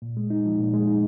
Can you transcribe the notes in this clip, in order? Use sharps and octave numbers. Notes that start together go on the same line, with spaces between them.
A#2
G#3
D#4
F3
A#2
G#3
D#4